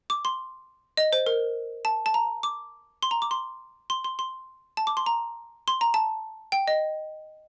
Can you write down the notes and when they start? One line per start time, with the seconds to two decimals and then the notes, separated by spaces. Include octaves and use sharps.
0.10 D6
0.25 C6
0.97 D#5
1.13 C5
1.26 A#4
1.85 A5
2.06 A5
2.14 A#5
2.43 D6
3.03 C6
3.11 A#5
3.22 D6
3.31 C6
3.90 C6
4.05 C6
4.19 C6
4.77 A5
4.87 D6
4.97 C6
5.06 A#5
5.68 C6
5.81 A#5
5.94 A5
6.52 G5
6.68 D#5